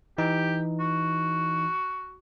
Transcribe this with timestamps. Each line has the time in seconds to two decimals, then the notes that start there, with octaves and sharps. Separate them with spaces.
0.18 E3 D#4 G4
0.80 F#4